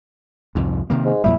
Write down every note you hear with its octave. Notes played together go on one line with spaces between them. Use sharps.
C2 F2 G#2
C3 D#3 A#3
G#2
F2 A#2 G3 E4